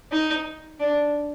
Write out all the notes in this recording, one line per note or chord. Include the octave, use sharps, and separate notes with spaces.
D#4
D4